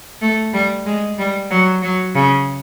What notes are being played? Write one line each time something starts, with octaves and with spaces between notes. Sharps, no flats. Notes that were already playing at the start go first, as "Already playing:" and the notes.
A3
G3
G#3
G3
F#3
F#3
C#3